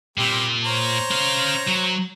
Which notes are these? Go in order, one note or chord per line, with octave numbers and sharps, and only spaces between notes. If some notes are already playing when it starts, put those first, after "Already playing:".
A#2 G3 C4
C5 C#5 A#5
C#4 F5
F#3